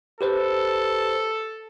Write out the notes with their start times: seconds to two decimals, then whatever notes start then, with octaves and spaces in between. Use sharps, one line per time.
0.21 G4 A4 B4 C5